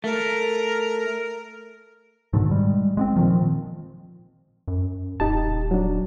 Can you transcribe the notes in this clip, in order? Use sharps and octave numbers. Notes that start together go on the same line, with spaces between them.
A3 A#4
G#2 B2 D3 D#3
G3 G#3
G#3 B3 C4
A#2 D#3 F3
F#2
D#1 D#4 G4 A5
F#3 D4